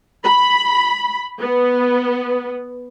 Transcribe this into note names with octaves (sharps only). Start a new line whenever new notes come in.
B5
B3